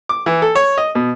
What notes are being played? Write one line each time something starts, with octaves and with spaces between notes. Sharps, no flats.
D6
E3
A4
C#5
D#5
B2